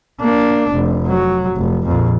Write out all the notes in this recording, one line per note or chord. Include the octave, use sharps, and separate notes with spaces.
A#3 D4
F1
F#3
F1
A#1 F2